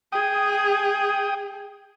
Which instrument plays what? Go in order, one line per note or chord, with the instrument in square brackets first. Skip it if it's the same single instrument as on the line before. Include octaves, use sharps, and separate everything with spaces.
[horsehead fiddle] G#4 [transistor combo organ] G5 D#6